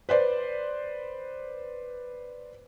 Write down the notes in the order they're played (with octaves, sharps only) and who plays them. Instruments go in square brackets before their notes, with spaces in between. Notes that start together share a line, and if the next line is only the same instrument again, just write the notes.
[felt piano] B4 C5 D5